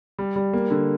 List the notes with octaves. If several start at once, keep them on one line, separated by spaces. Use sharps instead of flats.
G3
G3
A#3
D3